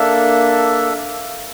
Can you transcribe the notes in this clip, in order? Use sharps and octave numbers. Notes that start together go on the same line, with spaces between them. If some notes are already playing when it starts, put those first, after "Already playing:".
Already playing: A#3 D4 A4 E5